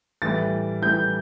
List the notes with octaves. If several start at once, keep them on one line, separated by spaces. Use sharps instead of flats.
A2 E3 G3 A6
A2 E3 G3 G6